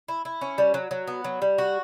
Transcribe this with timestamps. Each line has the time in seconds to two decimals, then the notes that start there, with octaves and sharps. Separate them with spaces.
0.08 E4
0.25 E4
0.41 C#4
0.58 G3
0.74 F#3
0.91 F#3
1.07 B3
1.24 F#3
1.42 G3
1.58 F#4